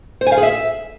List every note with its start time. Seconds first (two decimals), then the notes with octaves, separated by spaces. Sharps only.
0.21 C5
0.27 G#5
0.32 F5
0.37 G#4
0.43 E5